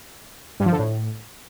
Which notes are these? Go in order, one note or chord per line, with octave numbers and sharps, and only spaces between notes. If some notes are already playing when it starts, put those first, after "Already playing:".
G2
F3
D3
A2